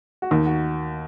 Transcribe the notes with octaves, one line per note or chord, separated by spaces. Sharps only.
F#4
D#2 D#4
F#4